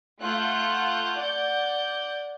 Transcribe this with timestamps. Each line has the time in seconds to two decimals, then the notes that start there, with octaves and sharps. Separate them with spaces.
0.20 A3 F4 F#5 F#6 G6
1.17 D5 F#5 G6